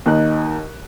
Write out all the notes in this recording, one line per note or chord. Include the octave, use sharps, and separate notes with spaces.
D#2 D#4 F#6